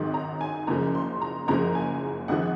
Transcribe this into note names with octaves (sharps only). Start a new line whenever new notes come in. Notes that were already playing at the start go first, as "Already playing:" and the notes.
Already playing: G#1 G#2 D#3 F#3 C6
A#5
G#5
F#1 F#2 C#3 F3 G#3 A#5
C6
A#5
F#1 F#2 C#3 F3 G#3 A#5
G#5
G#1 G#2 F3 F#5